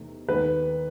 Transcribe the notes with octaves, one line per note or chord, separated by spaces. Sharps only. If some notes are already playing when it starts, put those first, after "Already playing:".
Already playing: E2 C3 A3 D#4
D#2 D#3 A3 B4